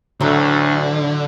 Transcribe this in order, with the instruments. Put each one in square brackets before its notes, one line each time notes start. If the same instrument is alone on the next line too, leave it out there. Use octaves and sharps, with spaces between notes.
[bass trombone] D2 [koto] A2 F#3 [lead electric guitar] D3